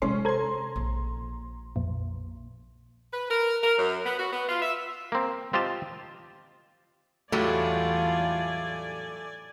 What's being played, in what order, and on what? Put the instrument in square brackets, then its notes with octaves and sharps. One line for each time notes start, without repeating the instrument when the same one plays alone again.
[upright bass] C3 G#3 [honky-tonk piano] C#4 [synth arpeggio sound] C6
[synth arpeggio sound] A4 C5 G#6 [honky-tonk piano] A#5 C6
[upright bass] A#1
[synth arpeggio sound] F2 A#2
[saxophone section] B4
A#4
A#4
F#2
B3
F#4
B3
F4
E5
[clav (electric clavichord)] A#3 C4
C4 F4 G4 D#5 A5
[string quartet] E2 F4 [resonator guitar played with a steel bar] A2 F#3 G3 [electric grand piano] A3 [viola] D5 G#5